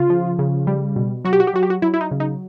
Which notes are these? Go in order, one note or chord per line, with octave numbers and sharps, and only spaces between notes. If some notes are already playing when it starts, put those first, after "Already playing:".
Already playing: C#3 F4
F3
C#3
G3
B2
F#3 F#4
G4
F#4
G4
F#3 F#4
G4
F#4
F#3 E4
E4
D#4
C#3
D#4